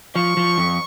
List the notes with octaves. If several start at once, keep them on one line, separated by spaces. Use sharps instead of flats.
F3 C#6
F3
F2